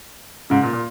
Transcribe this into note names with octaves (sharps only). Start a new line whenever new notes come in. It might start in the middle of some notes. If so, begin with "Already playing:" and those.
G#2 C#3
A#2
A#2